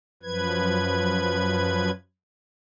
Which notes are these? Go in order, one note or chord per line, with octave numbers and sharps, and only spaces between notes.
F#2 F3 B4 G#6